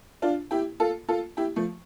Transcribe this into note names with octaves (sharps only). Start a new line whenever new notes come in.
D4 F4
E4 G4
F4 A4
F4 A4
E4 G4
F3 A3